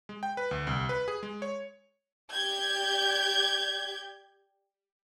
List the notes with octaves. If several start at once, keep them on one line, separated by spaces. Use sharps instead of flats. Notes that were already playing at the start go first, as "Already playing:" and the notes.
G#3
G5
B4
D2
C2
B4
G#4
G#3
C#5
G4 D5 G6 G#6